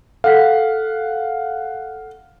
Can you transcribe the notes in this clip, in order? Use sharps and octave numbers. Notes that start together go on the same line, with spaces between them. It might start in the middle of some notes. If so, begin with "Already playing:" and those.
A4 F5 F#5 B6